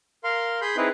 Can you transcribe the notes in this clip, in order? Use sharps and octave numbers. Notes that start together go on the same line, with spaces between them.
A#4 F5 C6
G#4 B5 C6 G6
C4 D#4 E4 G#4 B4